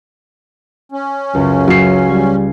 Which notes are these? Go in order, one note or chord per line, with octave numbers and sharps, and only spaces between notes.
C#4
C#2 F#2 C#3
F#3 C7
G3 G#6